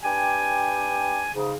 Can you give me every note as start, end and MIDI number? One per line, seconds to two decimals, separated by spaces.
0.04 1.28 62
0.04 1.28 67
0.04 1.28 71
0.04 1.28 79
0.04 1.28 80
1.34 1.54 44
1.34 1.54 49